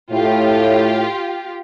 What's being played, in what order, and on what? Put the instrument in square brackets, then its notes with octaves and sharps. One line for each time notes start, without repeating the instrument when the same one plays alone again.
[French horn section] A2 [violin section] F4 G4